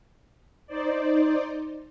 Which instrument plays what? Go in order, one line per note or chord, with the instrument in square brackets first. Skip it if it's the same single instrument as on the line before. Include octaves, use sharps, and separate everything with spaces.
[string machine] D#4 C5 D5